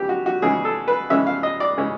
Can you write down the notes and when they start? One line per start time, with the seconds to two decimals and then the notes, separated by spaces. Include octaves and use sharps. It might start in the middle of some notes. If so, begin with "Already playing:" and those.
Already playing: C#3 E3 G4
0.09 F#4
0.26 F#4
0.42 C#3 E3 G#3 C#4 G#4
0.65 A4
0.88 B4
1.10 C#3 E3 G#3 C#4 E5
1.27 F5
1.43 D#5
1.60 D5
1.77 C#3 E3 G#3 C#4